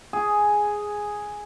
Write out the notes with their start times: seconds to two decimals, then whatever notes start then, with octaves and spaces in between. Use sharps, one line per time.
0.13 G#4